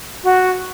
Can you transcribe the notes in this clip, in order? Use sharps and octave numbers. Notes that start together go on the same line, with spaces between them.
F#4